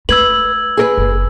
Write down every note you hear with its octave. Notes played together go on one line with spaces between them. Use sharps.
A3 B4 E6 G#6 F#7
G#4 A#4 B4
F#1